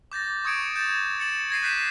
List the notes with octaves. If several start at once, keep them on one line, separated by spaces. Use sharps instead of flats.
D6 G6 A6 A#6
C#6 D#6 G#6 C#7 D7 E7
G6 A6 E7
A6 C#7 E7 F#7
G#6 A#6 C7 D#7
F#6 G6 B6 C7 D#7 E7